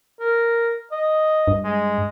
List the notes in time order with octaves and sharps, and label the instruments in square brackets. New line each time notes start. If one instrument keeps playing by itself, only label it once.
[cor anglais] A#4
D#5
[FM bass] G2
[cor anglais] G#3